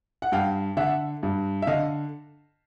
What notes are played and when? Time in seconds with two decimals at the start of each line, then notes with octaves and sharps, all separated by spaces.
0.22 F#5
0.32 G2 F5 G5
0.77 D3 E5 F#5
1.23 G2
1.62 E5
1.67 D3 D#5 F5